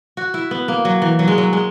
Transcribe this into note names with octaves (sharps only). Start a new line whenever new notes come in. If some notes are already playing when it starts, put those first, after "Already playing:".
F#4
E4
B3
A#3
F#3
E3
F#3
G#3
F#3
G#3